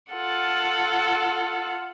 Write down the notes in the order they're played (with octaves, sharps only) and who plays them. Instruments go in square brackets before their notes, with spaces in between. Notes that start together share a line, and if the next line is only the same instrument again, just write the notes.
[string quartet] F4 A4 F#5